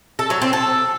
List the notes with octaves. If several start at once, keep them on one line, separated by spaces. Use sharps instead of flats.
A4
F#3
C4
A4